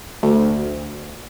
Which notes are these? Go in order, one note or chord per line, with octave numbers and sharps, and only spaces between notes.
D2